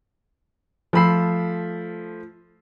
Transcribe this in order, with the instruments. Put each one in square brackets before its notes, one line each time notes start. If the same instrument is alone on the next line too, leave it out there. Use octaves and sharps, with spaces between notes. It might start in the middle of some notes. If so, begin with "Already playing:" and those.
[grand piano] F3 A3 F4 B5 E6 C7